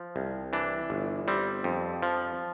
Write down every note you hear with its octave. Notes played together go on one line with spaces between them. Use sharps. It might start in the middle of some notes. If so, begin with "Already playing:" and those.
Already playing: F3
C2
E3 D4
G1
G3 C4
F2
F3